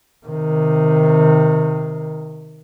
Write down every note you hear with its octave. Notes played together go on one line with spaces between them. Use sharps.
C3 D#3